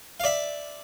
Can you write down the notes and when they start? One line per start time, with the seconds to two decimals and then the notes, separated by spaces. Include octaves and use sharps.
0.20 F5
0.24 D5 E5